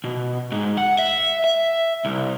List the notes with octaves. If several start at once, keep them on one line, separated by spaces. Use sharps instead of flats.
B2
G#2
F#5
E5
E5
C2